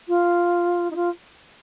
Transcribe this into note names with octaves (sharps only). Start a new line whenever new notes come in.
F4
D#4
F4